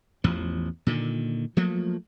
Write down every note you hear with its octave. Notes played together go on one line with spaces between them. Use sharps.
A1 E2 F3
A#2 D3 D#3
F3 F#3 A3 A#3